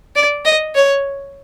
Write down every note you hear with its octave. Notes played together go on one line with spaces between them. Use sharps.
D5
D#5
C#5